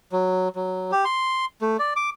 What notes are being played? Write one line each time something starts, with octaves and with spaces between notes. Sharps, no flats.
F#3
F#3
G4
C6
A3
D5
D6